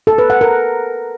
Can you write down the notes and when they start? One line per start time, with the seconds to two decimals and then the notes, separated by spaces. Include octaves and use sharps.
0.07 A4
0.18 B4
0.30 F#5
0.41 A#4